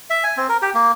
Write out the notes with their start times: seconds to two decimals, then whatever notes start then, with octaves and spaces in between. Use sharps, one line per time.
0.10 E5
0.24 G#5
0.37 C4
0.49 A#4
0.62 G4
0.74 A#3